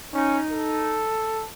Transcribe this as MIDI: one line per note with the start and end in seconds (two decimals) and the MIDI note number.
0.14 0.39 61
0.14 1.04 63
0.51 1.47 69